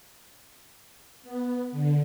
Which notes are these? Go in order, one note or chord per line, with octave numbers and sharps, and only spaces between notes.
B3
D3